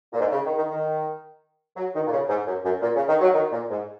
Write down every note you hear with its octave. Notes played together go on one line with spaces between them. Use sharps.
A#2
G#2
C#3
D#3
D#3
D#3
F#3
D#3
A#2
C#3
G#2
F#2
F#2
A#2
C#3
D#3
F#3
D#3
A#2
G#2